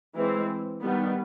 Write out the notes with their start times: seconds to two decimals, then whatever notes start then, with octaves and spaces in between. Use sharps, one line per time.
0.15 E3 G#3 C4
0.83 D#3 G3 B3